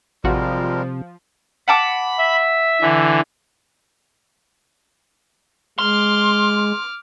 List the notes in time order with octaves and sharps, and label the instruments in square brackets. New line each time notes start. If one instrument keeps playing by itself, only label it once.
[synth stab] A1 F#4 [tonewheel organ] C3 [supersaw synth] F3 [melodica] G3 G#3 A#4
[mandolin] F#5 A5 D6 [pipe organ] B5
[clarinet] E5
[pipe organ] D3 E3
[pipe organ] G#3 [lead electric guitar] C6 [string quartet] D6 F6